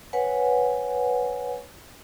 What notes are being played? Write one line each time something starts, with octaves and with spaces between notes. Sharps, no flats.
B4 C#5 F#5 G#5